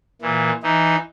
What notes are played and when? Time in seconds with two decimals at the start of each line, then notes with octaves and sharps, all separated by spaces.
0.22 A#2 E3
0.63 E3 D#4